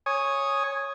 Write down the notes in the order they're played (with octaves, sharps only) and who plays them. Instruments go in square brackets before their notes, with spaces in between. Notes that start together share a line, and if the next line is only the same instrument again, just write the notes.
[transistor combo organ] C#5 G#5 D#6